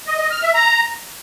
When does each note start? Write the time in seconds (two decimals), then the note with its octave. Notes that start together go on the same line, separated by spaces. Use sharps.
0.07 D#5
0.19 D#5
0.31 F6
0.42 E5
0.54 A#5